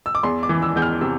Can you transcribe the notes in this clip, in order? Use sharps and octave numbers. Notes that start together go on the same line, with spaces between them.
E6
D6
E2 C6
D6
E3
E6
E2 G6
F6
C3 E6